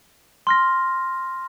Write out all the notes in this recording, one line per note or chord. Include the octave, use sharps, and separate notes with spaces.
C6 F6 A#6